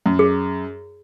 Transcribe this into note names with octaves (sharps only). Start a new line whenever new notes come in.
F#2
G#4